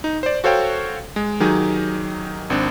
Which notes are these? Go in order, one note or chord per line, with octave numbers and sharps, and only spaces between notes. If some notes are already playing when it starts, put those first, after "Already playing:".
D#4
C5 D5
F#4 A4 C5 C#5 F5 G5
G#3
D#3 F#3 D#4 G4 G#4
G#1 C4 D4